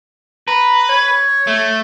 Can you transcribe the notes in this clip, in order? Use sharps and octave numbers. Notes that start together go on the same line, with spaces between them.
B4 A#5
C#5
A3